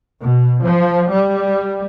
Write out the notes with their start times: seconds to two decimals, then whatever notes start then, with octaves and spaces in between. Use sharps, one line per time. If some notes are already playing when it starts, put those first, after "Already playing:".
0.21 B2
0.63 F3
1.11 G3